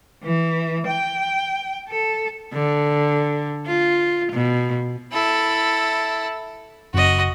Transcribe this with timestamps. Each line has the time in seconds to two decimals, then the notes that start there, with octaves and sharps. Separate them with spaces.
0.23 E3
0.88 G5
1.89 A4
2.53 D3
3.67 F4
4.32 B2
5.12 E4 A4
6.94 F#1 F#4 D#5